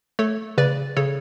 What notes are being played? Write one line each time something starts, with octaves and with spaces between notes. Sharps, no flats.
A3 A4 C#5
C#3 B4 D5
C#3 A4 C#5